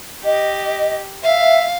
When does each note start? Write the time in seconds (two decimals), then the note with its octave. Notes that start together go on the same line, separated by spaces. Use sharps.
0.25 G4 D#5
1.23 E5 F5